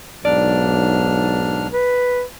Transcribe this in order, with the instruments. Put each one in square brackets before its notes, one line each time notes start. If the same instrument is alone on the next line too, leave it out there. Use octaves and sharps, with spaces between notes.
[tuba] B1 [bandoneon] G#2 D4 F6 [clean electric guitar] D5
[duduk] B4